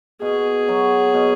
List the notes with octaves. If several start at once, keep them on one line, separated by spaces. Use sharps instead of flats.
B2 G#4
F#3
B2